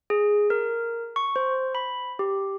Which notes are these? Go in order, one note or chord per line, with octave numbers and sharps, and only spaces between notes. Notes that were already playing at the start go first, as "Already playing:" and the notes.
G#4
A#4
C#6
C5
B5
G4